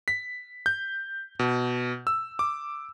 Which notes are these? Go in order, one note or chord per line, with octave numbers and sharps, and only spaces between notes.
B6
G6
B2
E6
D6